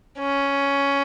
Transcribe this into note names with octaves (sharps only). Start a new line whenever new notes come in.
C#4